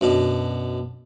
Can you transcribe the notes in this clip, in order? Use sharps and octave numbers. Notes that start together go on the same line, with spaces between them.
F#2 B2 D4